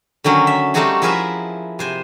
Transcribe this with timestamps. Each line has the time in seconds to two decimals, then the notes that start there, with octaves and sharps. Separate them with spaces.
0.24 D3 D#3 F#3 C#4
0.47 E5
0.74 G3 A3 C4 D#4 F#4 G#4
1.02 F3 E4 G#4 A#4 B4 E5
1.79 C3 C5 G#5